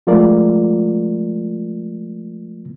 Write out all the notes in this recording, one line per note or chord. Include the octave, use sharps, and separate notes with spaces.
F3 G#3 A3 F4 A#4 D5